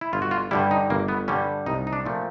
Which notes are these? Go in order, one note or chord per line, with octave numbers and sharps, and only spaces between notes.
E4
G1 F4
F#4
F4
G2 D3 G3 E4
D#4
G1 A#3
B3
G2 D3 G3 C#4
C2 D#4
D#4
D4
A#2 F3 A3